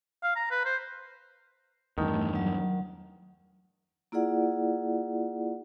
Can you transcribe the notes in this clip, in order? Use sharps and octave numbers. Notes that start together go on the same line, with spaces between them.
F5
A#5
B4
C5
E2 G2 D#3 A3
F#3
A#3 E4 F4 G#4 D5 F#5